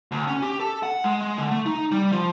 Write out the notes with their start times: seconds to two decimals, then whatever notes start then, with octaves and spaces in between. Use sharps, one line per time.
0.11 D2
0.28 C#4
0.42 G4
0.60 A4
0.83 F#5
1.04 G#3
1.21 G#3
1.38 D3
1.51 A3
1.66 D#4
1.92 G3
2.12 F3